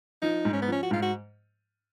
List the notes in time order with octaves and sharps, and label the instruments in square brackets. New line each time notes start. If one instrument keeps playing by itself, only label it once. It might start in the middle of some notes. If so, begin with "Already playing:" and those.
[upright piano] F3 [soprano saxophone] D#4
[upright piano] G#2
[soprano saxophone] C#4
B3
[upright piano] F3 [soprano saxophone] C#4
[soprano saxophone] F#4
[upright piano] G#2 [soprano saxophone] F4
[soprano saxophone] F#4